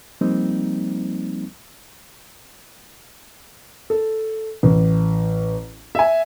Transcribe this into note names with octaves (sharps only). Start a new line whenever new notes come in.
F3 G3 A#3 C4 D#4
A4
A1
E5 G#5